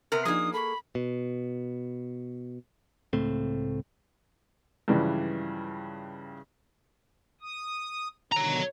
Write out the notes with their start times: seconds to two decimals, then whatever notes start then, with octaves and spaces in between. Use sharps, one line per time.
0.12 C3 B3 A#4
0.25 F3 A#3 D4 D#4 G#4 D#6
0.53 A4 B5 C#6
0.95 B2
3.13 C#2 A2 A3 C4
4.88 G2 C#3 E3 F3 G3 G#3
7.41 D#6
8.32 B2 D3 D#3 C#5 A#5